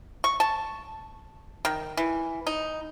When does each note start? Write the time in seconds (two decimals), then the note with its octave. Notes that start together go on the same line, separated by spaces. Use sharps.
0.24 C#6
0.40 A5
1.65 D#3
1.97 E3
2.47 D#4